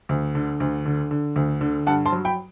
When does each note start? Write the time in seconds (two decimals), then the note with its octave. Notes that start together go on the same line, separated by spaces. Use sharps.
0.09 D2
0.35 D3
0.60 D2
0.86 D3
1.11 D3
1.36 D2
1.61 D3
1.87 G2 F#5 A5
2.06 A5 C6
2.12 F#3
2.25 G5 B5